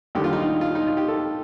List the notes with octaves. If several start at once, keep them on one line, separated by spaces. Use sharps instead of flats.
D#2 D3 G3 G4
F4
D#4
F4
F4
D#4
F4
G4
A4